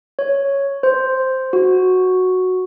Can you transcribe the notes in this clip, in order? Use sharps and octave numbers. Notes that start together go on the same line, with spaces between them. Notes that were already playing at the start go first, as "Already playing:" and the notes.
C#5
C5
F#4